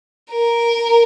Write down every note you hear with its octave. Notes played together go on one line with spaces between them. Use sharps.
A#4